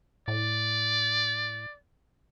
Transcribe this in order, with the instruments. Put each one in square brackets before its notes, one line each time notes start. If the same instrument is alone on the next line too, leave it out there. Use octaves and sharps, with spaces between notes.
[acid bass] A2 [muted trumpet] D5